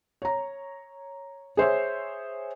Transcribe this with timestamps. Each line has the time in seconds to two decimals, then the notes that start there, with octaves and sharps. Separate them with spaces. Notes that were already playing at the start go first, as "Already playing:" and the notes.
0.22 C#5 A#5
1.57 G#4 C5 C#5 E5